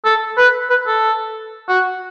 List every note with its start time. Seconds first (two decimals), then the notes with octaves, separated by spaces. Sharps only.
0.04 A4
0.37 B4
0.70 B4
0.87 A4
1.68 F#4